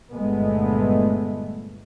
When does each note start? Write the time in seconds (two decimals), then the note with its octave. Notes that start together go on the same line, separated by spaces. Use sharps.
0.14 G1 A#2 G#3 A3 B3